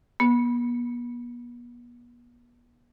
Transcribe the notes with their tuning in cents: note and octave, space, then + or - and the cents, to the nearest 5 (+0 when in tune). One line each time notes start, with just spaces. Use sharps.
B3 -40